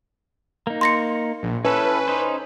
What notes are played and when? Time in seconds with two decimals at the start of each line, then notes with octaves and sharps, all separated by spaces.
0.67 A#3 D#4
0.81 C6 A#6 C#7
1.43 A#1
1.65 C#4 E4 A4 B4
2.08 D#4 C5